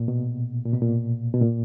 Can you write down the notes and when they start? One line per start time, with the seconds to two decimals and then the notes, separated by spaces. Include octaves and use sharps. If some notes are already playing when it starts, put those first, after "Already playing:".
Already playing: A#2
0.08 B2
0.65 A#2
0.73 B2
0.81 A#2
1.34 B2
1.41 A#2